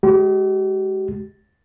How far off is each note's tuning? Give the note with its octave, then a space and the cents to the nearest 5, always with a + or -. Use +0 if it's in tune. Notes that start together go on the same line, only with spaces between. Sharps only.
G#3 +0 G4 -45